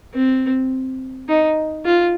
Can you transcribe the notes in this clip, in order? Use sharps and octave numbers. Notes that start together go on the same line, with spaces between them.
C4
D#4
F4